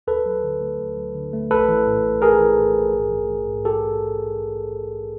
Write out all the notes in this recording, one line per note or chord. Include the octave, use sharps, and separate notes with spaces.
D2 A4 B4
F#3
D3
A3
D2
F#3
D3
A3
A#1 A4 B4
E3
A2
A#1
A#1 G#4 A#4
E3
A2
A#1
G#2
A3
E3
G#2
G4 A4